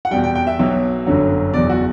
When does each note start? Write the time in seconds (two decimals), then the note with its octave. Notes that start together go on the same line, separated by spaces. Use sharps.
0.05 F#5
0.11 E2 B2 G3 G5
0.24 G5
0.35 G5
0.47 E5
0.59 B1 B2 F#3
1.06 G1 F#2 D3 F#3
1.54 F#1 E2 B2 D5
1.70 F#4